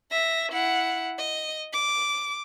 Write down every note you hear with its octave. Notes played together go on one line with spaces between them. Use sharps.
E5 A#6
E4 F#5
D#5
D6